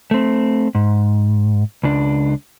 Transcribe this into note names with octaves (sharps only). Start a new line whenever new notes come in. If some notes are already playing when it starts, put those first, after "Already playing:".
A3 C4
G#2
C#2 D4